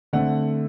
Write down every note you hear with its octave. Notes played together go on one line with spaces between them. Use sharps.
D3 A3 C4 F#5